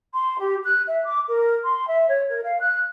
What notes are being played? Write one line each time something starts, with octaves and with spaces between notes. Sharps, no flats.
C6
G4
F#6
E5
D6
A#4
C6
E5
C#5
A#4
F5
F#6